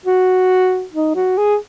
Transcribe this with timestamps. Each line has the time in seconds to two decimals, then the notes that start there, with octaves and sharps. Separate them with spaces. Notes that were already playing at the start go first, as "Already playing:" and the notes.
0.06 F#4
0.93 D#4
1.15 F#4
1.38 G#4